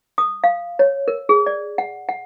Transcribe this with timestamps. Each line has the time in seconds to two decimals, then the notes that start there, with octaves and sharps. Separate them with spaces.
0.18 D#6
0.44 F5
0.79 C#5
1.08 A#4
1.29 G#4
1.46 D5
1.78 F#5
2.09 F#5